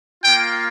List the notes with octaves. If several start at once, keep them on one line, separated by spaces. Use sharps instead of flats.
A#3 F4 G5